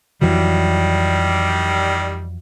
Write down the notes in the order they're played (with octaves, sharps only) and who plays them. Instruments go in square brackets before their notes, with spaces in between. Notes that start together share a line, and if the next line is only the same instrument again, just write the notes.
[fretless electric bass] F2 E3 F#3 [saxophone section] D#3 G3